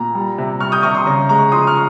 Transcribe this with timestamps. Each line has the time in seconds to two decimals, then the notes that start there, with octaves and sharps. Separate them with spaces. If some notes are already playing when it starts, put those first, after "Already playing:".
Already playing: A#2 A#5
0.15 G3
0.38 C3
0.60 G3 C#6 F6
0.72 D#6 G6
0.83 C3 C#6 F6
0.95 C6 D#6
1.06 C#3 A#5 C#6
1.29 G#3 A#5 C#6
1.52 F3 C6 D#6
1.67 C#6 F6